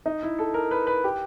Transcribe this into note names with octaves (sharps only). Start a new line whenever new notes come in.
D#4
E4
A4
A#4
B4
B4
G4